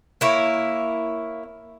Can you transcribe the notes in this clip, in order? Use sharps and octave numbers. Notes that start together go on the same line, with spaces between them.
A#3 E4 C#5